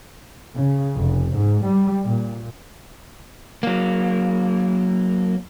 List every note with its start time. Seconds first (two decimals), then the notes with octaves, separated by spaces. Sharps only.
0.55 C#3
0.96 F1
1.34 G#2
1.64 G3
2.04 A#2
3.63 F#3 A#3